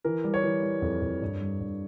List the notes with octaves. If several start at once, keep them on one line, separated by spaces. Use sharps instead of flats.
E3 A#4
G3
C#5
E3
G3
F2
F2
G2
G3
G2